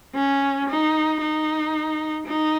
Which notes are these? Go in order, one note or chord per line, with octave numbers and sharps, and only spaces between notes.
C#4
D#4
D#4
D#4